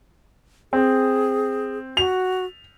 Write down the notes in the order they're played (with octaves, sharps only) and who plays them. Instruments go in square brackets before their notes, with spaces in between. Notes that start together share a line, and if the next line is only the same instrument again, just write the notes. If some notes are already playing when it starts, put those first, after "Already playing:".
[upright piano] C4 [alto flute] G#4
[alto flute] F#4 [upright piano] F7